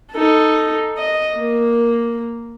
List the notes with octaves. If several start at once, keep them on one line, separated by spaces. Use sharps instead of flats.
D#4 A4
D#5
A#3